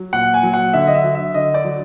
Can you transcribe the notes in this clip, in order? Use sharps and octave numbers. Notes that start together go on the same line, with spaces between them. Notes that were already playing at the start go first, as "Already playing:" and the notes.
Already playing: F#3
A#2 F#5
G#5
F#3
F#5
D3 E5
D#5
E5
F#3
E5
D3 D#5
D5
F#3